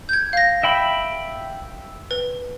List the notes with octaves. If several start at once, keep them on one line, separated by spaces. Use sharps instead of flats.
G6 G#6
F5 A#6
E5 G5 B5
B4